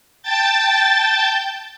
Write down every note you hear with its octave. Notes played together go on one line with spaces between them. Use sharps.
G5 A5 G6 A6